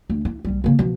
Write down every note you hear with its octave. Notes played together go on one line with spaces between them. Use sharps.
D2
E4
B1 G3
C#3 A#3
B2 F3